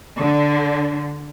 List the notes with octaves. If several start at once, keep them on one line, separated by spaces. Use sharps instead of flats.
D3